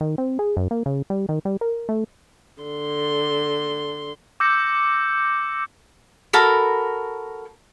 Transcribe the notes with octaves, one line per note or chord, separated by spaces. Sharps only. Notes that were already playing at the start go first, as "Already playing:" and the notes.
D#3
C4
G#4
F#2
A#3
C#3
G3
D#3
G3
A#4
A3
D3 C6
D6 E6 G6 A#6 C#7
F#4 A4 A#4 B5